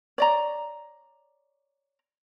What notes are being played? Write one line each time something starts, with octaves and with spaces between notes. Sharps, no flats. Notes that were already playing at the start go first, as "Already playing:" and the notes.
C#5 D5 A#5